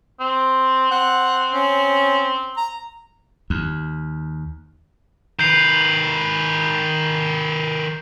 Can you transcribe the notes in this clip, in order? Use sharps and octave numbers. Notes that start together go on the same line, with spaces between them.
C4
C4 F#5
C#4
A#5
D#2
D#3 B4 G6 C7 F7